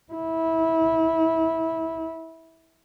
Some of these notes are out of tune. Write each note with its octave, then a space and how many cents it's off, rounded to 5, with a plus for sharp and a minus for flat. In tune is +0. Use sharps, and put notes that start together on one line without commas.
E4 -20